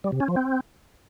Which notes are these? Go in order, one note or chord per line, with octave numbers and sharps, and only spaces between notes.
G3
C3
C#4
F3
C4